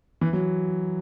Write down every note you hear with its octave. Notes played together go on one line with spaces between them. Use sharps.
E3
F#3